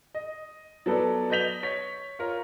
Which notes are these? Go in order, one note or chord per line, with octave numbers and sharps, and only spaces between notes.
D#5
F#3 B3 A4 B4 D5
B4 D#5 G6 B6 F7 G7
C#5 C#6 B6
F4 A#4 C#5